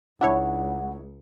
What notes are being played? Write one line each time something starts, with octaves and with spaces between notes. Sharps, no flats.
C#2 D4 E4 C#5 F#5